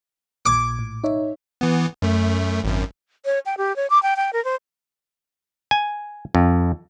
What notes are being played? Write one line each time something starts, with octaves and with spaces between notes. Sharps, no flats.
A#1 A#2 D6 G#6
A2
D#4 C#5 E5
E3 B3
F#2 A3
G#1 F#2
C#5
G5
G4
C#5
D6
G5
G5
A#4
C5
G#5
F2